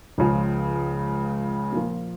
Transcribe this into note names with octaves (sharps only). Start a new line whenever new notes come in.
C#2 C#3 F3
A#2 F3 A#3 F4